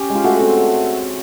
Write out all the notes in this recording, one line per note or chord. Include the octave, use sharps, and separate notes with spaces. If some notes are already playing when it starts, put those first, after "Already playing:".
Already playing: C#4 G4
G#3
F4
A3 F#4
C4